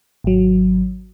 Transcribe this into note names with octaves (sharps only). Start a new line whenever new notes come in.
G#1 F#3